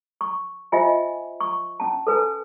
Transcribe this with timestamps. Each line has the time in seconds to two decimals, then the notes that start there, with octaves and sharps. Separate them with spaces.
0.21 C#6
0.72 F4 C5 D#5 E5 G5 G#5
1.41 C#6
1.80 C#4 A5
2.07 A4 B4 G#5